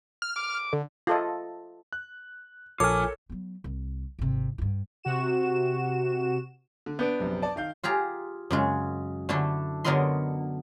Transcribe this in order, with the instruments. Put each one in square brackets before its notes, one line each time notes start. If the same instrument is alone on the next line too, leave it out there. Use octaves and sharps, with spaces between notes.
[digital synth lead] F6
[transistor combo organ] D6
[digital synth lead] D3
[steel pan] F4 A4 D#5
[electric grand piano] F#6
[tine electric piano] A#1 [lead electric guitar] F4 G#5 [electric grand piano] A4 A#4 C#5 [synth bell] D6 F6
[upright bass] F#3 B3
C2
G#1 C3
G2 E4
[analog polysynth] C3 F#4 E7
[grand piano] D3
[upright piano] B3 D4 [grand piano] G6 D7
[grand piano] A#1 F#2 C3
D5 A5
D#3 F5 G6
[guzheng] F4 G4 G#4 A#5
F#2 C#3 G#3
D3 A3 D4 E4
D3 F#3 B3 A#4 D#5 C6